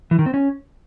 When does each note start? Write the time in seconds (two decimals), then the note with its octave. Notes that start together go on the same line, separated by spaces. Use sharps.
0.11 E3
0.19 D#3
0.26 C4
0.34 C#4